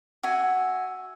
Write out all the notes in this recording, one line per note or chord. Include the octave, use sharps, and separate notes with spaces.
F#4 E5 G#5